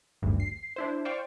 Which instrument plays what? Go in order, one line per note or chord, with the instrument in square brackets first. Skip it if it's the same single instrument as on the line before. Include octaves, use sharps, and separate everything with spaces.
[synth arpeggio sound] G#1 D2 G2
C7
D4 E4 C5
C5 D5 F5 G5 C#6